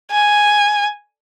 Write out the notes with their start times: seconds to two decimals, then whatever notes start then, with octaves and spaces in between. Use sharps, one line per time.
0.11 G#5